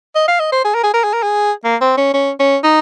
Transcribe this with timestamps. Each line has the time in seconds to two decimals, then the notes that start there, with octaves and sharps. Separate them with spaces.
0.15 D#5
0.28 F5
0.40 D#5
0.52 C5
0.65 G#4
0.75 A#4
0.83 G#4
0.94 A#4
1.04 G#4
1.13 A#4
1.23 G#4
1.64 A#3
1.81 C4
1.97 C#4
2.14 C#4
2.39 C#4
2.64 D#4